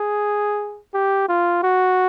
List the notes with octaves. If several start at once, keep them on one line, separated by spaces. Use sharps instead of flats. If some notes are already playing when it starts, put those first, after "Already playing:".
Already playing: G#4
G4
F4
F#4